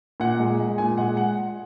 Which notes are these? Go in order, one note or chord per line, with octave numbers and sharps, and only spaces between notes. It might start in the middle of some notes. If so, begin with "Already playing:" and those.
A#2 F#5
G#3
G#3
A#2 G#5
G#3 F#5
F#5